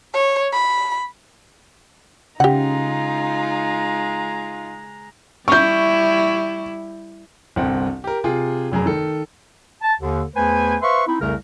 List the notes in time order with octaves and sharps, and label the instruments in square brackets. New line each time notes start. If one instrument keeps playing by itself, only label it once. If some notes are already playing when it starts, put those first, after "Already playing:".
[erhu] C#5
B5
[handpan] C#3 [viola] G#3 A#5 [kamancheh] D#4 F4 [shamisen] G4 F#5
[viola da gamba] G3 E4 [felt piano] C#6 G6
[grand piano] G1 C2 C4 F#5
G4 A#4
C3 F4 G#4
F1 F#2 G#4 A#5
D#3 A4
[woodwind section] A5
D#2 D3
E2 A3 B4 C5 G#5
B4 C5 E5 F5 C6 C#6
C4 D#4 E4
C2 F2 C#3 A3 A#4